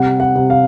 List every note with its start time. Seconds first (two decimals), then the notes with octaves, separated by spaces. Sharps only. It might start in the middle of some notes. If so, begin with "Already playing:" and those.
Already playing: C3 G3 F#5
0.20 F#5
0.35 C3
0.50 F5